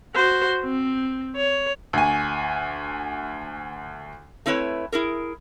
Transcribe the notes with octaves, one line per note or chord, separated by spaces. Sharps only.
F#4 C5
C4
C#5
D2 G#5
A3 C4 E4 B4 C#5
E4 G#4 A#4